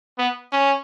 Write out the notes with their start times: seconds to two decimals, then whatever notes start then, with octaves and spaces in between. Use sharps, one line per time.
0.18 B3
0.52 C#4